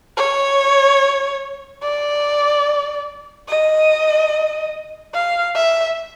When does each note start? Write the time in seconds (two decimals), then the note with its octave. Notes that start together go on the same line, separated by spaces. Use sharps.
0.17 C#5
1.82 D5
3.48 D#5
5.14 F5
5.55 E5